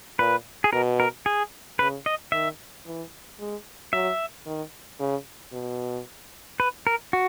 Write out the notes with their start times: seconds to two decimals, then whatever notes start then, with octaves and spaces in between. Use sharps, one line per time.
0.19 A#2 B4
0.64 G#4
0.73 B2 A#4
1.00 A#4
1.26 G#4
1.79 C#3 B4
2.06 D#5
2.32 D#3 E5
2.87 E3
3.40 G#3
3.93 F#3 E5
4.46 D#3
5.00 C#3
5.53 B2
6.60 B4
6.87 A#4
7.13 F#4